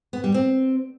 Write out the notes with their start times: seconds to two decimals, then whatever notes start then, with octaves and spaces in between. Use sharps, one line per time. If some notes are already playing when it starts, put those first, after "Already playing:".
0.13 B3
0.24 G3
0.34 C4